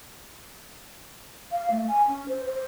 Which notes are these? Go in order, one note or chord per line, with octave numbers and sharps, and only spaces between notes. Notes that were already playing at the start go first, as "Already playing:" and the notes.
F5
A3
G#5
C#4
C5
C5